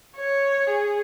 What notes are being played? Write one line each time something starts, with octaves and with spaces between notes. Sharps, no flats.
C#5
G#4